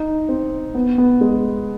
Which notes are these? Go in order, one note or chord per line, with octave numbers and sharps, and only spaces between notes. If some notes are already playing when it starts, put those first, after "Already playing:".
Already playing: D#4
C4
B3
B3
G#3